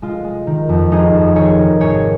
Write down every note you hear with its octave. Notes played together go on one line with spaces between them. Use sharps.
G#3 F4
G#3
D#3
F2
G#3 D#4 G#4
F2
D#3 G#4 C#5
D#3
G#1 G#4 C#5